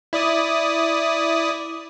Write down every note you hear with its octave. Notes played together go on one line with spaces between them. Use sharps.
E4 D5 D#6